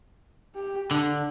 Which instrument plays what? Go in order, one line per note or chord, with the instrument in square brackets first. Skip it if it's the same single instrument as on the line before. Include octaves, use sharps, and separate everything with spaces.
[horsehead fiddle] G4
[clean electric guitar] D3 [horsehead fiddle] D4